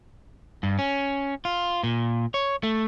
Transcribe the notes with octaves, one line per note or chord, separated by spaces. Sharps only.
G2
C#4
F4
A#2
C#5
A3